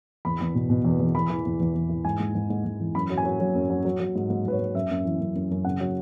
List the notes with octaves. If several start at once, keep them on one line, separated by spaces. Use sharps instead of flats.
E2 B5
E2
B2
B2
E2
E2
E3 B5
E3
E2
E2
E2
E3
G#2 G#5
G#2
G#2
G#2
G#2
E3
F#2 B5
F#3
G#5
F#3
F#3
F#2
F#3
F#3
F#3
G#2
G#2
G#2 B4
C#5
G#2
F#2 E5
F#2
E3
F#2
F#2
F#2
C#3 F#5
F#3